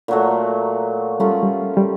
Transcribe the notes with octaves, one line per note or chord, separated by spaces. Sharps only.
A#2 F#3 A3
G3 A3 C#4 F4
G3
G3